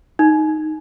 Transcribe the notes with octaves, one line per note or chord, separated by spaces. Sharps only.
D#4